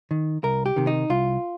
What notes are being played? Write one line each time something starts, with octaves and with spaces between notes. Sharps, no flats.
D#3
C2 A#4
G4
C3 D#3
D#4
C2 F4